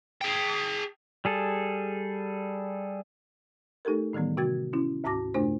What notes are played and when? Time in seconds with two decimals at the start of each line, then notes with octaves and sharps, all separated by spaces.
0.21 G#4 G5
1.25 G3 G#4 A4
3.85 A3 D#4 G4 A4 A#4
4.13 A2 D#3 E3 G3 B3
4.37 C3 F#4 G5 G#6 A6
4.73 C#4 E4
5.04 D2 G#2 F#4 A5 D6 A#6
5.34 F#2 C3 A3 D4 C5